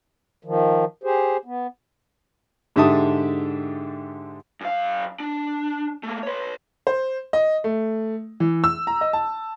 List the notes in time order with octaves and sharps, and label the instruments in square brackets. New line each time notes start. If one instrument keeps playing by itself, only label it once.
[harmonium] D#3 F3
G4 G#4 C5
B3
[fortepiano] G#2 D3 G4 E5 A5 D#6
[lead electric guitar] F#2 F5
D4
A3 A#3
B4 C#5
[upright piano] C5
D#5
A3
E3
E6
A#5
D#5
A5